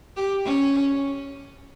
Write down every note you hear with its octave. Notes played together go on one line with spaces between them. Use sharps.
G4
C#4